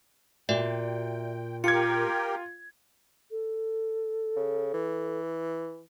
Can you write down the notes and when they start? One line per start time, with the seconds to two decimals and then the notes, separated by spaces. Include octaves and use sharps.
0.49 A#2 F#4 D5 E5 G5
1.64 F4 G4 A#4 G5 G#6 C#7
3.31 A4
4.36 C#3
4.74 E3